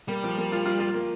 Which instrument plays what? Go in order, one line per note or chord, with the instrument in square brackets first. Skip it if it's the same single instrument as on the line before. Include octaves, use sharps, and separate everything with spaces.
[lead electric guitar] G3 [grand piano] A#3
[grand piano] F3
A#3
F4
F4
F4
A#3